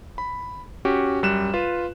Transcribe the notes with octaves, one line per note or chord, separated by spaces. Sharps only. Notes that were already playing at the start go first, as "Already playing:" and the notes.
B5
C#4 F#4 G4
F#2 G3 F#6 E7
F4 B4